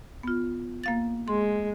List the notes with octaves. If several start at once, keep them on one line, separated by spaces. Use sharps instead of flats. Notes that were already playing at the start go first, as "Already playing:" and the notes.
B3 F4
A#3 F5 A6
G#3 C6